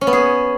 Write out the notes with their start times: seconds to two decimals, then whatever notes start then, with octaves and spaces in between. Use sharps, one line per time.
0.01 C#4
0.07 B3
0.13 G#4